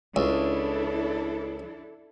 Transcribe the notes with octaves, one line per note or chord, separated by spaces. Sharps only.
C#2 D4 E4 A4